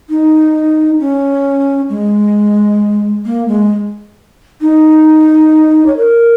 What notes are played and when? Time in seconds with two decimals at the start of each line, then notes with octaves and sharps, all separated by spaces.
0.09 D#4
1.00 C#4
1.89 G#3
3.26 A#3
3.48 G#3
4.62 D#4
5.87 C#5
5.97 A#4